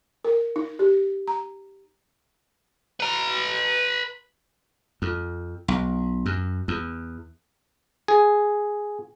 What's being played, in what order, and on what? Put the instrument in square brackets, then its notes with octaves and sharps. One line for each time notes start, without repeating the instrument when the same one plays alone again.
[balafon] A#4
D#4
G4
A#5
[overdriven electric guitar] B4 A#5
[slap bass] F2
B1
F#2
E2
[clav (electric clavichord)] G#4